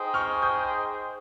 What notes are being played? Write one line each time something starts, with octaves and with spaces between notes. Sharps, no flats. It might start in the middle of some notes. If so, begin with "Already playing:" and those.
Already playing: D#4 G#4 C5 D#5 G5
C#6 F6
D#6 G6